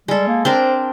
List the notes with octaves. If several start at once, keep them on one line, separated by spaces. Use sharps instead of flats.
G3 G#3 A4
A#3
C4 D4 A#4 C5